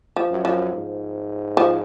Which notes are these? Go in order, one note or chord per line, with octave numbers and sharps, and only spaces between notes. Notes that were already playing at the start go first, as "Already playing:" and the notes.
F3
F#2
F3
G#2
F3